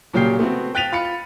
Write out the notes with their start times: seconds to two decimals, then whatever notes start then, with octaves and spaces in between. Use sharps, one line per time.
0.13 A#2 C#3 F#3 G4 G5 C7
0.39 A3 B3 C4 F#4
0.75 G5 F#6 A6 B6 D#7 F7
0.92 F4 B5 A6 C#7